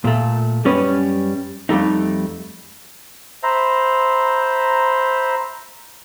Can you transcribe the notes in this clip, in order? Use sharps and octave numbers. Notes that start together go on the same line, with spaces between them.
A#2 A3
F#2 G3 C#4 B4 D#5
F2 G3 A3 D#4
C5 E5 A#5 B5